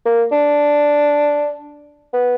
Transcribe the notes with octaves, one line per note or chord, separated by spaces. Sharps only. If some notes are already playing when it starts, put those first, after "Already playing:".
A#3
D4
B3